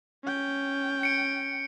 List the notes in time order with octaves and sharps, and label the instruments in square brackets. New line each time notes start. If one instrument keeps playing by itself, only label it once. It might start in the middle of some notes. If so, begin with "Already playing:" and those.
[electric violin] C#4 G5
[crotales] C#7 D7